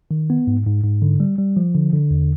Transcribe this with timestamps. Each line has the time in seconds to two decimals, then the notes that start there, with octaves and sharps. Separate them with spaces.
0.11 D#3
0.30 B3
0.47 G#2
0.66 G#2
0.84 G#2
1.02 D3
1.20 G3
1.38 G3
1.57 F3
1.75 D3
1.93 D3
2.11 E2